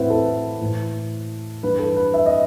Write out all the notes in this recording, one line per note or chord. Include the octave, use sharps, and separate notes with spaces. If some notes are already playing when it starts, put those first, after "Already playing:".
Already playing: A2 E3 C4 E4 F#4 B4 C5 E5
A4
A2 E3
G2 E3 B4
A4
B4
E5
D#5